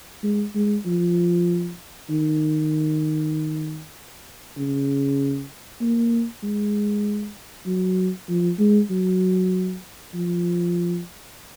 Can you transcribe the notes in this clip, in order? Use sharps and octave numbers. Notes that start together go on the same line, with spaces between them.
G#3
G#3
F3
D#3
C#3
A#3
G#3
F#3
F3
G#3
F#3
F3